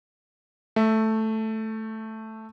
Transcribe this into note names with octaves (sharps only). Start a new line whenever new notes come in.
A3 E5